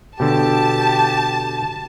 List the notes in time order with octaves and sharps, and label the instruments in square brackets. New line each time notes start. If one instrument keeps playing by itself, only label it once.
[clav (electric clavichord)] B2 D3 [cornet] G4 [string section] A5